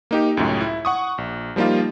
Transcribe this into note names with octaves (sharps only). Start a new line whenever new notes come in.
A#3 D#4 G4
C#2 F#2 A2
E4
F#5 C#6 D#6
A#1
F3 G3 A#3 D#4 F4